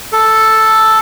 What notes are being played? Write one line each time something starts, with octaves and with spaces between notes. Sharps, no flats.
A4